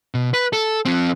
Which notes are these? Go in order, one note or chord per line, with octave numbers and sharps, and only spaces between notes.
B2
B4
A4
F3 C4